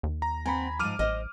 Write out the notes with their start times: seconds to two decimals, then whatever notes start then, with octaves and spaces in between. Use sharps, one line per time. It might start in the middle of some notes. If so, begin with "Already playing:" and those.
0.03 D#2
0.22 A#5
0.46 C4 F#5 G#5 A#5 B5
0.79 G#2 F3 D6 F6 D#7
0.99 A1 C5 D#5